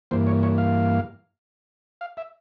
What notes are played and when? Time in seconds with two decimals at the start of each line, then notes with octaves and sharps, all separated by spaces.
0.11 G2 E3 A#3 C5
0.27 C#5
0.43 C#5
0.58 F5
2.01 F5
2.17 E5